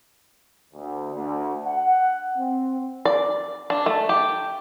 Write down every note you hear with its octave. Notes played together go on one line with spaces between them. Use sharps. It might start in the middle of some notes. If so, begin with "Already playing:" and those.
D2
D2
F#5
C4
D5
D4
A3
G4